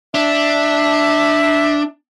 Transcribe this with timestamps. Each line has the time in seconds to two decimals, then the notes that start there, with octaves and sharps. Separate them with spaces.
0.14 D4 E5